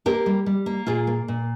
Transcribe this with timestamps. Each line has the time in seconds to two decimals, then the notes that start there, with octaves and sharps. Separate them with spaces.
0.06 A#3 G4 A#4
0.26 G3
0.46 G3
0.66 A#3
0.86 A#2 F4 G#4
1.07 A#3
1.28 A#2